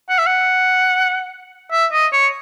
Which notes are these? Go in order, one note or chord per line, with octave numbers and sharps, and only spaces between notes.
F#5
E5
F#5
E5
D#5
C#5